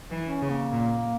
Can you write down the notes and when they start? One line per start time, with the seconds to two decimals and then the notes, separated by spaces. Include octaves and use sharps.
0.11 E3
0.26 C#4
0.42 C#3
0.50 A#3
0.72 A#2